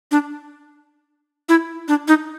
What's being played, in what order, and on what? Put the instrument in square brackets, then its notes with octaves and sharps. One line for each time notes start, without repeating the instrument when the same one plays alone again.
[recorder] D4
E4
D4
D#4